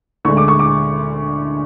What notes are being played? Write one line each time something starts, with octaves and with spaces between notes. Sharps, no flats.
D2 D3 G#3 C#6
D6
C#6
D6